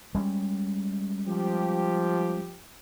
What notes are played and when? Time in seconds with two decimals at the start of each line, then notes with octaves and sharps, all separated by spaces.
0.15 G3 G#3 C#4
1.28 F3 G4